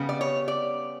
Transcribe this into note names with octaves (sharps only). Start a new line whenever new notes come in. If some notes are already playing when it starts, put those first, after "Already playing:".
Already playing: C#3 G3 B3
D5
C#5
D5